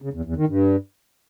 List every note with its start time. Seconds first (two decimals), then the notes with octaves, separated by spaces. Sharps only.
0.02 C#3
0.13 E2
0.25 E2
0.36 D#3
0.48 G2